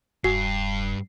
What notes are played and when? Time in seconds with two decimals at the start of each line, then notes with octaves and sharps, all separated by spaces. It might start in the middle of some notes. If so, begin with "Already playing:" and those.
0.24 E1 G2 F#4 G#5 C#6 C7